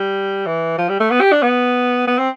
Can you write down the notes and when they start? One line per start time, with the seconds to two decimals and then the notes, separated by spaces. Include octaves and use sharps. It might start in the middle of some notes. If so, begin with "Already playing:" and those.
Already playing: G3
0.46 E3
0.78 F3
0.89 G3
1.00 A3
1.11 B3
1.21 G4
1.32 D4
1.43 B3
2.07 B3
2.18 C4